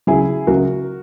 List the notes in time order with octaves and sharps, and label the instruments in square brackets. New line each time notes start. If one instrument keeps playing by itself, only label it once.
[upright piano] C#2 C#3 F#3 E4 G#4
C#2 C#3 F#3 F#4 A#4